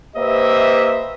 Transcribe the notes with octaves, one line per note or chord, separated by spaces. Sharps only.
A#3 G4 B4 C5 D#5 E5